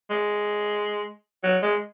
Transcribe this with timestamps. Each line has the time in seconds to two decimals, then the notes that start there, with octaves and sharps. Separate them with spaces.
0.10 G#3
1.44 F#3
1.62 G#3